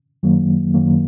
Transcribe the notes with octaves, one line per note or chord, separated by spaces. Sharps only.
F#2 D#3 F#3 A#3
F#2 D#3 F#3 A#3